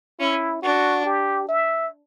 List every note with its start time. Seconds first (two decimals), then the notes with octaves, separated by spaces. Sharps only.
0.19 C#4 E4
0.62 D4 F#4
1.05 G4
1.49 E5